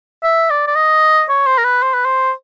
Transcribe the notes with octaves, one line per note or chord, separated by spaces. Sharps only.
E5
D5
D5
D#5
C#5
C5
A#4
B4
C5
B4
C5